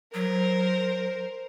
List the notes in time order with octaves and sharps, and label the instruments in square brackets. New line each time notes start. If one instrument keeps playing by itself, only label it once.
[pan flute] F#3 [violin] A#4 C5